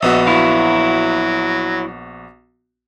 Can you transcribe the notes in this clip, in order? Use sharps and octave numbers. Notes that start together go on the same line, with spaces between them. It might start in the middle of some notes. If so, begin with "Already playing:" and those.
A#1 B3 F#4 D#5 E5
F#3 E4 F5